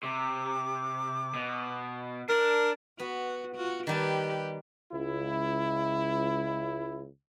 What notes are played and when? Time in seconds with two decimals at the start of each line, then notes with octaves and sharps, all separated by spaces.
0.03 C3 D6
1.34 B2
2.29 D4 A#4
2.99 B3 F#4
3.56 F4 F#4
3.87 D#3 G3 G4 B4 A5
4.91 C#2 E4